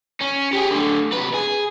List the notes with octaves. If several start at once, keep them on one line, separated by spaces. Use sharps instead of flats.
C#4
G4 G#4
A2 D3
C3 B4
G#4